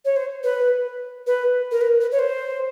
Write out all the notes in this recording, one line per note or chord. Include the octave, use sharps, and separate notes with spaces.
C#5
C5
B4
B4
A#4
B4
B4
C#5
C5